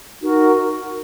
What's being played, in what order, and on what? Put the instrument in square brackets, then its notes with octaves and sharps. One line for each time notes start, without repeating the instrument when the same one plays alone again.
[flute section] D#4 F#4 A#4